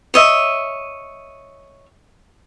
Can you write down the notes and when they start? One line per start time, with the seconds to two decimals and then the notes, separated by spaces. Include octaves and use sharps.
0.14 C#5 D#5 E5